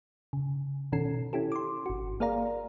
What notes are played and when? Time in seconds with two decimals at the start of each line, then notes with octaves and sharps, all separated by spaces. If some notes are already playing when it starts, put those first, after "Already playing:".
0.33 C#3
0.92 B2 D#3 C#4 A4 C7
1.33 C#4 E4 G4 A4
1.52 C6 D6
1.86 G1 F#4
2.20 A#3 G#4 A#4 D5 F5 A#5